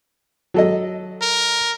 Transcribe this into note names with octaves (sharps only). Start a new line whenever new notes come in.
F#3 A4 D#5
A#4